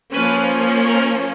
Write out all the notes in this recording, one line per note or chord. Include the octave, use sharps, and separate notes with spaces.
F3 A#3 C#4 B4
A#4